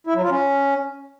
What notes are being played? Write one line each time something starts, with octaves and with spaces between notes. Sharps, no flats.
E4
F#3
F4
C#4